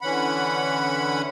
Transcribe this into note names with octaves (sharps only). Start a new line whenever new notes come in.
D3 E3 C#4 F#5 B5